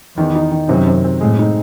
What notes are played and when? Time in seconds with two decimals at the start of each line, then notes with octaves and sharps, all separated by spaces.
0.18 E2 D#3
0.35 D#4
0.51 D#3
0.69 F#2 C3
0.87 C4
1.04 C4
1.21 A2 G#3
1.39 D#4